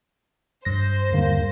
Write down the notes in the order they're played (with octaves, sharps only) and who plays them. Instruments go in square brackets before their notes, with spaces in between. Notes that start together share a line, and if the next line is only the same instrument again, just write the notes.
[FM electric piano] G2 A#6 [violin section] C5
[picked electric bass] D#2 D3 G3 [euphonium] A#3